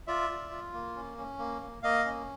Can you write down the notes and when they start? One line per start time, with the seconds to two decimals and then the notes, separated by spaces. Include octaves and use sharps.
0.07 F4 D5 E5
0.30 F4
0.51 F4
0.73 A#3
0.96 C#4
1.18 C#4
1.39 A#3
1.62 A#3
1.83 A#3 D#5 F5
2.05 C#4